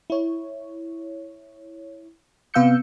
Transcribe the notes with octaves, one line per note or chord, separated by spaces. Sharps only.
E4 C#5
C3 B3 F5 E6 G6 C#7